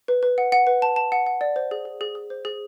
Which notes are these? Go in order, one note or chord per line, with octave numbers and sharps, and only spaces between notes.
B4
B4
F#5
F#5
B4
A5
A5
F#5
F#5
D5
C5
G#4
G#4
G#4
G#4
C5
G#4